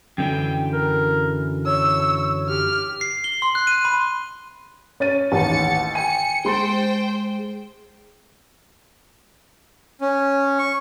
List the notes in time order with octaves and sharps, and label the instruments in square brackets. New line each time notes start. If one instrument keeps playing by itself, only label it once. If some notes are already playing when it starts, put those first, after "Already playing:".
[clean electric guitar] F#2 D3 E3 [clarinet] G5
[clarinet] A#4
[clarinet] C#5 [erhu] E6
[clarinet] G4 [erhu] F6
[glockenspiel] C7
G7
C6
F#6
D#7
B5
[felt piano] C#4 A6 D#7 [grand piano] C#5
[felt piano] A1 D#2 [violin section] A6 C#7
[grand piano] G5 G#5 [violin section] C#7 [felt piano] D#7
[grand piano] G#3 C6 A6 [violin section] C5 G5
[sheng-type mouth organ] C#4
C#6